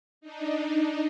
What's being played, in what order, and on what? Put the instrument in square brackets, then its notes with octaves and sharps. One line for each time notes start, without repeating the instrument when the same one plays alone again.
[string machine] D4 D#4